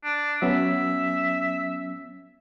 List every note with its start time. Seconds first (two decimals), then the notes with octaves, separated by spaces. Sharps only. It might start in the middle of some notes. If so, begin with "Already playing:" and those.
0.04 D4
0.42 F#3 B3 C#4 E5